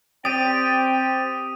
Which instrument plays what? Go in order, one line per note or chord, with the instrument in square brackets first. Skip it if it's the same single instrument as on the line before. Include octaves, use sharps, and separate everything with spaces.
[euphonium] C4 [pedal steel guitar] G4 D5 [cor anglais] G5 [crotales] D#6 D#7